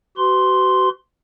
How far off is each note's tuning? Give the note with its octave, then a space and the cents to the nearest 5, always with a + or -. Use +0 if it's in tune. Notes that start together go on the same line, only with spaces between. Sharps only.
F#4 +35 B4 +30 C6 +0